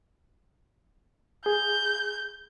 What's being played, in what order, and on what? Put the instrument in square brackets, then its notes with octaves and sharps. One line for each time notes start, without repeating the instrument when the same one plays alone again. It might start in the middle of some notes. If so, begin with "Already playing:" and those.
[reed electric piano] G#4 [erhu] G6